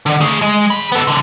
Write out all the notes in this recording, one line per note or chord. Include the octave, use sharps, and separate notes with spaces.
D3
A3 G#4
G#3
G#4 B5
B3 A4
C#2 D3